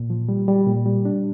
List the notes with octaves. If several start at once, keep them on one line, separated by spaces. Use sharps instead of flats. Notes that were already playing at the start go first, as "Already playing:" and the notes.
Already playing: A#2
F3
G3
G3
A#2
G3
D4